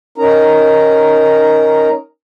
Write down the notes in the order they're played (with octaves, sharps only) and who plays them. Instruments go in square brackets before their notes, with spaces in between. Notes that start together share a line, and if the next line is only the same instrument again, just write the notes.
[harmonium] C#4 D#4 A#4 A#5